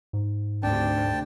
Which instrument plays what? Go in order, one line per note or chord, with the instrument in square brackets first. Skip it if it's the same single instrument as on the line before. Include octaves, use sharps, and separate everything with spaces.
[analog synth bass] G#2
[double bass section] D2 C3 [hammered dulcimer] D4 [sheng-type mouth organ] G5 A5